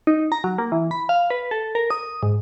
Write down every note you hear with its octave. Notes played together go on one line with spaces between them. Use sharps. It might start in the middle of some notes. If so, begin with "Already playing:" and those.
D#4
A#5
F#3
A#3
E3
B5
F5
B4
A4
A#4
D#6
G#2